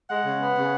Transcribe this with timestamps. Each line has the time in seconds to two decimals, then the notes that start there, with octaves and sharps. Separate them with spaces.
0.09 G#3 F#5
0.25 C#3
0.40 B3
0.56 C#3